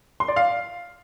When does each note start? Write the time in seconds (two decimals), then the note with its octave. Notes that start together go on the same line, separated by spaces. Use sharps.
0.20 C6
0.28 D5
0.36 F5